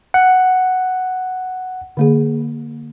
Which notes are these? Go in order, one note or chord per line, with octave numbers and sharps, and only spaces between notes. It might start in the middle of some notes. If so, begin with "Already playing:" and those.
F#5
D3 A#3 G#4